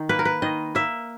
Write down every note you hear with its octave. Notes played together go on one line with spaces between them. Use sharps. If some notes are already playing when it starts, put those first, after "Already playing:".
Already playing: D#3 D#4
A#3 B4
A#4
B4
D#3 D#5
A#3 E5